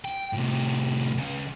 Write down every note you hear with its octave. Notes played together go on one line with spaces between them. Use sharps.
G5
A2 C3
C#3 F4